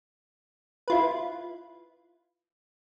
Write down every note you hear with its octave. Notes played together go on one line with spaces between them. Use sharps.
E4 F4 B4